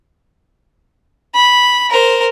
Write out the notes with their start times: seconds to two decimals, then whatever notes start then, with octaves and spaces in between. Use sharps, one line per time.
1.35 B5
1.90 A#4 C5